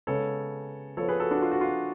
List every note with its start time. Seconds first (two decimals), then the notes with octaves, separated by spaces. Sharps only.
0.07 C#3 G#3 B3 A4 C#5
0.97 F3 A4 C#5
1.01 B3
1.08 G#4 B4
1.20 F#4 A4
1.31 D4 F#4
1.42 F4
1.52 F#4
1.61 F4